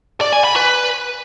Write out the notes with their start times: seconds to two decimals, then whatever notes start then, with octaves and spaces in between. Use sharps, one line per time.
0.21 D5
0.33 G#5
0.44 B5
0.56 B4